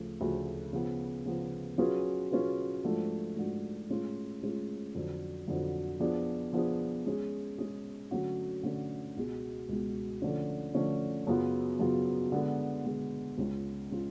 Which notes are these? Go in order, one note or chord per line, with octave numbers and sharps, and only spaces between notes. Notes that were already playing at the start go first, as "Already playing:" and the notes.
Already playing: D2 C#3 F3 A3
D2 C#3 F3 A3
C#3 F3 B3
C#3 F3 B3
F#3 C#4 F4 G#4 B4
F#3 C#4 F4 G#4 B4
G#2 F3 A3 D4 F#4
G#2 F3 A3 D4 F#4
A2 G#3 C#4 F4
A2 G#3 C#4 F4
F2 D3 F#3
F2 D3 F#3
F3 B3 D4 G#4
F3 B3 D4 G#4
G#3 C#4 G#4
G#3 C#4 G#4
D3 F#3 A3 C#4 F#4
D3 F#3 A3 C#4 F#4
C#2 B2 G#3
C#2 B2 G#3
D3 F3 A3 C#4
D3 F3 A3 C#4
F#2 C#3 F#3 B3 F4
F#2 C#3 F#3 B3 F4
D3 G#3 B3
D3 G#3 B3
C#2 C#3 G#3 C#4 F4
C#3 G#3 C#4 F4